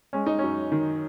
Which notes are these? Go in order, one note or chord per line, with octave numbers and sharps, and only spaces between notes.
G#3 C#4
D#4
F#2 C#4
D#3